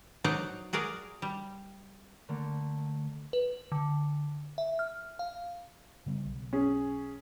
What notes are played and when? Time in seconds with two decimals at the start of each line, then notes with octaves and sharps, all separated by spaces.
0.24 F#3 D#4 C5 D5 F#5 A#5
0.73 F#4 G#4 A#4 D5
1.22 G3
2.29 D3 A3 A#3
3.33 B4
3.72 D3
4.58 E5
4.79 F6
5.19 F5
6.06 C#3 G3 B3
6.26 B1
6.53 C#4 G#4